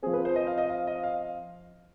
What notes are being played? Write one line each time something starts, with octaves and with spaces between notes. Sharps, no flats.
F3 C4 G#4
B4
C5
D#5
F5
D#5
F5
D#5
F5